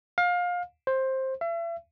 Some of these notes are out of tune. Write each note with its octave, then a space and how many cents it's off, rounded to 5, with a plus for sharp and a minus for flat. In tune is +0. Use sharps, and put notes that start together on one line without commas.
F5 +25
C5 +15
E5 +40